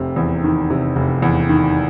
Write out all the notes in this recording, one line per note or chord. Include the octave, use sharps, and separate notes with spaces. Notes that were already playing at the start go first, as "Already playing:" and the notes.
Already playing: F1 C3
E2
D#3
C3
F1
E2
D#3